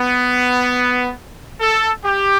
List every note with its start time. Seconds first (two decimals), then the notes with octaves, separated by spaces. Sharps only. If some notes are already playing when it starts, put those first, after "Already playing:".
Already playing: B3
1.61 A4
2.04 G4